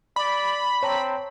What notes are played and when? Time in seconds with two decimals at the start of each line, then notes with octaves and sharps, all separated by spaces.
0.16 D5 B5
0.83 C4 C#5 A5 A#5